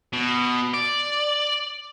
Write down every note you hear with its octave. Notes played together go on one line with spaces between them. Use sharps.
B2
D5